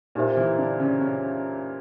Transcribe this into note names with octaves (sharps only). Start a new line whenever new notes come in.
A#2 A#3 D#4 G4 C5 E5
E3 E4
D3 D4
C#3 C#4
C#3 C#4